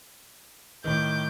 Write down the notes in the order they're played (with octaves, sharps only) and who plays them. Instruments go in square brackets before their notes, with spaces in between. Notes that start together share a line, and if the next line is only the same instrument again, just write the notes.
[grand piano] A2 D#3 [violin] D6 G6